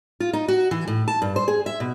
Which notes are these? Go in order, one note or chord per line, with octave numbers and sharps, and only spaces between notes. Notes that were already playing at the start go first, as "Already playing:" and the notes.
F4
D#4
F#4
E3
A2
A5
G2
C5
G#4
E5
B2